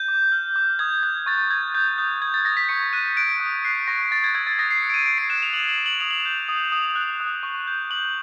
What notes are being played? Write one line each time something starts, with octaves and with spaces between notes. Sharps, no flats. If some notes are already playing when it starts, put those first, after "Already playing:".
Already playing: G6
D6
F6
D6
D#6 G#6
F#6 G#6
C#6 A6
G6 G#6
D#6 G6
D#6 G6
D#6 G#6
A6
D#6 A#6
B6
C#6 C#7
F#6 D#7
F#6 D7
D#6
F#6 C7
C#6 A#6
C#6 A6
G#6
E6 G#6
A6
D#6 A#6
C7
F#6 C#7
D7
D#7
F#6 D7
C7
F#6 E7
F7
D6 F#7
F#7
D6
F#7
D#6 F7
F#7
F7
G6
D#6
D#6
F#6
D#6
C#6
G6
D6 F#7